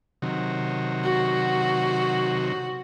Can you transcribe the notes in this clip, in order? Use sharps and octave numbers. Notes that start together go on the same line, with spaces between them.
C3 D#3 F#3
F#4